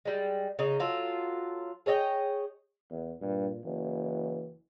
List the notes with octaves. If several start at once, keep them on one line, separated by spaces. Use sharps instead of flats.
G3 G#3
C#3 D#4
F#3 F4 A4
G#4 C#5 D#5 G5
E2
G2 A#2
F#1 E3